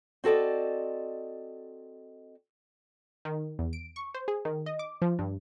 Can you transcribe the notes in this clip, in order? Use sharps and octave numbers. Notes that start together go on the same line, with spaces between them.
C4 F#4 A4 D5 D#5
D#3
E2
D7
C#6
C5
G#4
D#3
D#5
D6
F3
G2